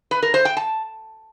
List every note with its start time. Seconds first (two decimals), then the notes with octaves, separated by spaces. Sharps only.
0.11 B4
0.22 A#4
0.34 C5
0.45 G5
0.57 A5